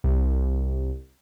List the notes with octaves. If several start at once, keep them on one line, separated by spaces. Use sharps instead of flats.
C2